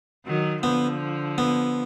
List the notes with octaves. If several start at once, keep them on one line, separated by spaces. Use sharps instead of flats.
D#3 F#3
D3 F3 B3
B3